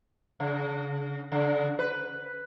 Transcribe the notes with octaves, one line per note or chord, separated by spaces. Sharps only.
C#3
C#3
B4